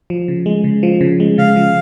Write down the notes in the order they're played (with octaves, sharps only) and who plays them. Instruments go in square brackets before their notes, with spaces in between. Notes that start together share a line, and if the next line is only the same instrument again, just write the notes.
[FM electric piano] F3
C#3
G#3
C#3
F3
C#3
G#3
[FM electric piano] C#3 [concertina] F5
[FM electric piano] F3